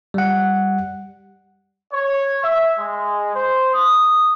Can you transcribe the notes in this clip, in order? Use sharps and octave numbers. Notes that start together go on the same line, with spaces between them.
G3 F#5
C#5
E5
G#3
C5
D#6